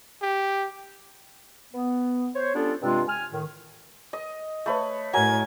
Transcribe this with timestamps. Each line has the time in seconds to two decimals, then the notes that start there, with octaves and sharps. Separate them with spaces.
0.22 G4
1.73 B3
2.36 C5 C#5
2.55 G3 B3 C#4 D4 F4 A4
2.82 G2 C3 G#3 C4 D4 F4
3.08 G#5 F6
3.32 A2 D#3
4.13 D#5
4.66 A3 B4 C#5
5.13 A2 F#3 A#4 G#5 G#6